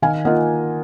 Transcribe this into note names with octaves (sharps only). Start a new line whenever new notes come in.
D#3 F5 G#5
A#3 F4 D#5 F#5